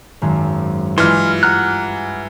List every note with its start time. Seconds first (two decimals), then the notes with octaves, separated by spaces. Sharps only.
0.22 G#1 F#2
0.98 G2 E3 G#3 F4 C6 F6
1.43 F#5 A#5 F6 F#6